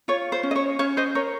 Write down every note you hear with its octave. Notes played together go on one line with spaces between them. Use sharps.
F4 C#5
C5
C#4
D#5
C#5
C#4 C#5
C5 D#5
A#4 C#5